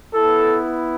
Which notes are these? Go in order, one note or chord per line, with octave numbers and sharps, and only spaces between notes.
B3 E4 A4